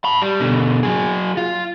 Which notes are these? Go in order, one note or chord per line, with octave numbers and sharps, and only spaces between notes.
A5 B5
G3
B2 D3
F#3 G#4
F4